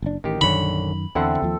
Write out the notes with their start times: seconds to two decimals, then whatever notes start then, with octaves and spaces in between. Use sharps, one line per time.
0.02 F#1 D4
0.24 A1 D#3 G4
0.41 A#1 F#2 D3 D#3 C#5 B5
1.15 E2 D3 C4 E4 A4 E5 F#5
1.42 D#2 F3